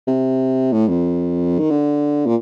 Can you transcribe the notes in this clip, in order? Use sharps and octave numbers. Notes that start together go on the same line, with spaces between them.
C3
A2
F2
D#3
D3
A#2